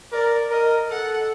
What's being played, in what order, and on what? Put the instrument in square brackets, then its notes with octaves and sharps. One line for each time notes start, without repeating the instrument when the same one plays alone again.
[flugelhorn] A#4 [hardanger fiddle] D5
[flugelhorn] A#4 [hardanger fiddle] D#5
[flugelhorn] A4 [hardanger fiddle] F#5